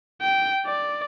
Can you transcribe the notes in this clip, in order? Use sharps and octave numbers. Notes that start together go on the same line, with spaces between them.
G5
D5